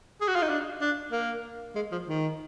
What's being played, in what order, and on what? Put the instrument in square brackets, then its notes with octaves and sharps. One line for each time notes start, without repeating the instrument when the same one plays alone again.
[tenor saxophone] G#4
F#4
F4
D#4
D4
D4
A#3
G#3
F3
D#3